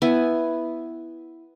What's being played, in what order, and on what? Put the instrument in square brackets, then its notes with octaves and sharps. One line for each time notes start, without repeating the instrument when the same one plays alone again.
[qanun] B3 E4 G#5